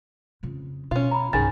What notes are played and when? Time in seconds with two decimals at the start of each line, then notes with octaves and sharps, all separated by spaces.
0.43 F2 C#3
0.91 B2 C#4 F4
1.11 A#5 B5
1.33 C2 G2 D#3 C#4 G#4 G#5 A6